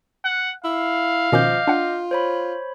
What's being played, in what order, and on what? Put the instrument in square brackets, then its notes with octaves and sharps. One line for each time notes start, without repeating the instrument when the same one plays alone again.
[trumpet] F#5
[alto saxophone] E4 [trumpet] F5
[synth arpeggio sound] B2 D#3 C#4 [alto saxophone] F3 [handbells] D#5 D6 G6
[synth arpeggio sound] D4 F#5 [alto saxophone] F4
[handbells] C5 C#5 B5